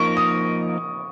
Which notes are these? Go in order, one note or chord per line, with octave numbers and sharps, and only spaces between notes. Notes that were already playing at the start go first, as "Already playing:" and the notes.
Already playing: F3 A#3 D#4 A#4 C#6
D#6